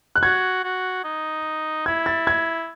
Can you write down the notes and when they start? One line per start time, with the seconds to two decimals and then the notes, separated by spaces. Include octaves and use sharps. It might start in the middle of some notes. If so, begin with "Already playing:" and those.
0.15 F#6
0.23 F#4 G#6
0.64 F#4
1.04 D#4
1.86 E4 G#6
2.06 A6
2.27 G#6